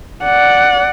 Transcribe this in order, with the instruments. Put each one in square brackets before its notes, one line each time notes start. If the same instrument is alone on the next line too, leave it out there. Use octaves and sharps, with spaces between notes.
[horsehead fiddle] D5 F#5